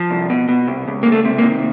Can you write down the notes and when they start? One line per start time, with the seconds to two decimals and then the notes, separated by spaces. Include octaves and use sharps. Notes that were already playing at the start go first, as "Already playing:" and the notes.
Already playing: F3
0.11 C2
0.30 B2
0.49 B2
0.67 C2
0.88 C#2
1.03 C#2 A#3
1.12 A3
1.25 C3
1.38 A#3
1.44 D#3